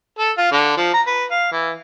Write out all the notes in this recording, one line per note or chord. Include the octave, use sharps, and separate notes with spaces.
A4
F4
D3
F3
A#5
B4
F5
E3